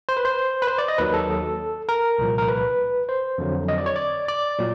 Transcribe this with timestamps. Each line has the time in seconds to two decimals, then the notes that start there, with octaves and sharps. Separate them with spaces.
0.09 C5
0.17 B4
0.25 C5
0.62 B4
0.68 C5
0.78 D5
0.88 D#5
0.98 D#2 D#3 F#3 B4
1.14 A4
1.89 A#4
2.18 C2 A#2 F3
2.38 A#4
2.48 B4
3.09 C5
3.38 F2 D3 F#3
3.68 D#5
3.78 D5
3.86 C#5
3.96 D5
4.28 D5
4.59 A#2 F#3